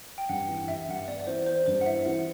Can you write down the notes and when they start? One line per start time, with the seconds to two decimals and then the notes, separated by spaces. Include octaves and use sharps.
0.18 G5
0.29 G2 F#5
0.49 E3
0.68 G2 E5
0.88 G2 F#5
0.99 E5
1.07 B3 D5
1.20 D5
1.27 E3 C5
1.46 B3 C5
1.66 G2 C5
1.81 F#5
1.86 E4 E5
2.06 E3 F#5